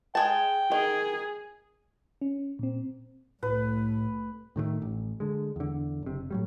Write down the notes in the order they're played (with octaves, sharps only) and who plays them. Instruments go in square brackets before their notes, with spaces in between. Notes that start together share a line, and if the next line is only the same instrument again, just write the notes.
[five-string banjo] G#3 G#4 A5 [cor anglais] G5
[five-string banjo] D#3 [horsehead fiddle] G#4
[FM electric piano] C#4
A#2 C4
[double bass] C2 A3 [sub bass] A2 [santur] B4
[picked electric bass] A2 D#3 F3 A3
A1
D3 G#3
E2 D3
F#1 C3
A2 F#3 G3